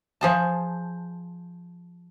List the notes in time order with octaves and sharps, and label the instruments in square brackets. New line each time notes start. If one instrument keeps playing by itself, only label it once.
[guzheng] F3 G#4 A5